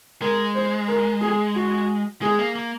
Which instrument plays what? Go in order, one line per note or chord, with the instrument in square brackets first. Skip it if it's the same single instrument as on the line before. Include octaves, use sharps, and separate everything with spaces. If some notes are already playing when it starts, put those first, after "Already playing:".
[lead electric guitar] G#3 [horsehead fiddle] A#4
[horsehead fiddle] C5
A#4
G#4
F#4
[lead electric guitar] G#3 [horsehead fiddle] G#4
[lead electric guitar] A#3
A#3